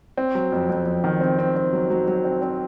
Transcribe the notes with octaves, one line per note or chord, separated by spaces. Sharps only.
C4
F#3
F2
F2
F2
D#3
C4
C4
C4
F#3
F#3
F#3
C4
C4